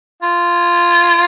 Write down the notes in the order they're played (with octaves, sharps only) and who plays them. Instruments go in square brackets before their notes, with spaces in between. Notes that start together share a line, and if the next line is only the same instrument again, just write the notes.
[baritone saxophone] F4